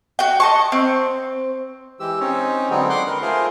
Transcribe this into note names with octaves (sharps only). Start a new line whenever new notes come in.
F#4 G5
D#5 A5 C#6
C4
E3 G#3 G4 E6
C4 C#4 D#4 C#5
D3 F#3 G#3 B3 C4 D#4
F#5 C6 D6
D#3 A#4 B4
A3 F4 G#4 A#4 C5